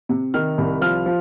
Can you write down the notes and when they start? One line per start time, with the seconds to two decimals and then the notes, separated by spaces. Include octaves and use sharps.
0.09 C3
0.34 D#3 F6
0.58 C2
0.81 F3 F6
1.06 F3